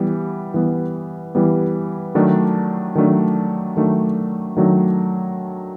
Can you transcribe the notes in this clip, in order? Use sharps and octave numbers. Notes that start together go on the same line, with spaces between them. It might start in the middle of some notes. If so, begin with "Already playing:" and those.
Already playing: E3 G3 B3
E3 G3 B3
E3 G3 B3
D#3 F#3 A3 D4
D#3 F#3 A3 D4
D#3 F#3 A3 D4
D#3 F#3 A3 D4